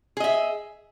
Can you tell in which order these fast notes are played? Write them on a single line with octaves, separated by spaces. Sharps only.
G#4 D#5 E5